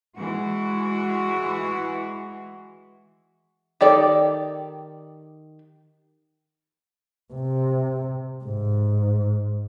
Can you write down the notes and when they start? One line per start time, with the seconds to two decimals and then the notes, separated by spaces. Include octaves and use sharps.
0.15 E3 G#3 F#4
3.81 D#3 G4 A4 D5
7.34 C3
8.44 G#2